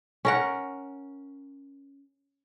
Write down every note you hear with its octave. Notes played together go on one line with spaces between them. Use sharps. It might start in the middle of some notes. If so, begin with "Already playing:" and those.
C#4 A#4 F#5